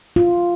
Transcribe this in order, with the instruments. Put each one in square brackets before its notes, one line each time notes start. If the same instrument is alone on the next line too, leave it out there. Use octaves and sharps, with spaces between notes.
[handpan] F4